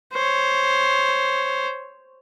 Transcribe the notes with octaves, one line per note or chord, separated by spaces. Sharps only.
C5 C#5